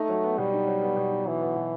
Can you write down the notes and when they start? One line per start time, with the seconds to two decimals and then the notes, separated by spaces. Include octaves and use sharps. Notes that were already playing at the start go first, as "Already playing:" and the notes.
Already playing: A3 D#4
0.09 F#3
0.24 B3
0.38 B2 G3
0.53 D#4
0.67 F#3
0.82 B3
0.96 B2
1.11 D#4
1.26 E3 F#3
1.41 B3
1.56 B2